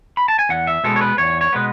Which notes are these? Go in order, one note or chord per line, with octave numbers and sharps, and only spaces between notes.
B5
A5
G#5
E2 F#5
E5
B2 G#3 B3 A4
C#5
B4
E2 C#5
C#5
B2 G#3 B3 B4